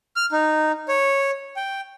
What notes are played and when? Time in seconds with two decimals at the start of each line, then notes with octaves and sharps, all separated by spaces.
0.16 F6
0.32 D#4
0.88 C#5
1.56 G5